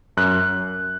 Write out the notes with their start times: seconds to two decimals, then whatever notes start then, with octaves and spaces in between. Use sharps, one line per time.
0.17 F#2 F#6